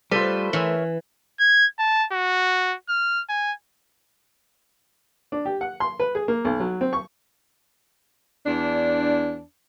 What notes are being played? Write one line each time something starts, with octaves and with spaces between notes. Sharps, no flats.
G3 A3 F4 B4 C5
E3 A#4 C#5 E5
G#6
A5
F#4
F6
G#5
D4
G4
F#5
C6
B4
G#4
A#3
B1
F#3
C4
C#6
E2 D4